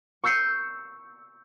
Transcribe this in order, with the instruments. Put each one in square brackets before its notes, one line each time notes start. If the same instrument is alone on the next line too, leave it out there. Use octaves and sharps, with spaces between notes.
[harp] C#6 E6 G6 C7 C#7 D#7